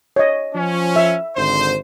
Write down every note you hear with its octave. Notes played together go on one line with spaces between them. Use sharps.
C#5 D#5
F3 C#4
E5
G#1 D3 C5